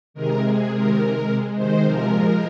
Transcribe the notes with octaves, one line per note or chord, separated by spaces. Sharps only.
C3 D#3 G#3 A#4
C3 G#3 G#4
C3 D#3 G#3 A#4
C3 G#3
C3 G#3
C3 D#3 G#3 C5
C3 F3 G#3 A#4
A#2 F3 G#3